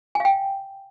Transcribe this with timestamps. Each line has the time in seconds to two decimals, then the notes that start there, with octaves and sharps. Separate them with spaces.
0.15 G#5
0.20 F5
0.25 G5